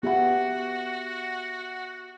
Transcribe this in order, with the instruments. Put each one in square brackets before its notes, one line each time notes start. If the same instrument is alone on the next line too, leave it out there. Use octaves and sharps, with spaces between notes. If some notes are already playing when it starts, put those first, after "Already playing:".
[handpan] B3 [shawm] F#4 [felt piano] G4 E5 F#5